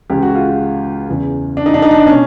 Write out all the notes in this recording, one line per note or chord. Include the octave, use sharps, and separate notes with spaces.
C#2 C#3 E3 G4
F#4
F4
F#4
E2 C#3 E3
D4
D#4
D4
D#4
D4
B2 C#4